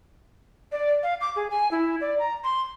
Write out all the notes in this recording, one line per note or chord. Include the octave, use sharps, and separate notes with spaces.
D5
F5
D6
G#4
G#5
E4
D5
A#5
C6